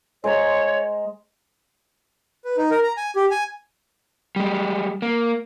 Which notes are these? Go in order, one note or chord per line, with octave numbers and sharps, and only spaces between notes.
G#3 C5 C#5 A#5
B4
D#4
A#4
A#5
G#5
G4
G#5
G3 G#3
A#3